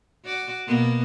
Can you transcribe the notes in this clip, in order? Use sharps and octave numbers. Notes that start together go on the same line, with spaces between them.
F#4 D5
B2 A#3 B3